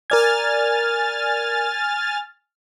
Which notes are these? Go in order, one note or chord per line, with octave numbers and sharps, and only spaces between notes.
A#4 D5 G#5 F6 G#6 A6